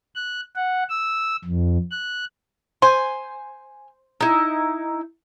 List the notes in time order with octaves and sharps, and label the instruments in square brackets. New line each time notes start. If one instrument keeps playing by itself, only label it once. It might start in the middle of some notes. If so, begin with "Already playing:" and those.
[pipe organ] F#6
F#5
E6
F2
F#6
[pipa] C5 [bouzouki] G#5
[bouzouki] D#4 E4